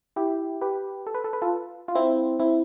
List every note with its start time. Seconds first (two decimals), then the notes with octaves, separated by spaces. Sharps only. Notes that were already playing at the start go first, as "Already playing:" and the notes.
0.16 E4 G4
0.61 G4 B4
1.07 A4
1.14 B4
1.24 A4
1.33 B4
1.42 F4 A4
1.88 F4
1.95 C4 E4
2.40 C4 E4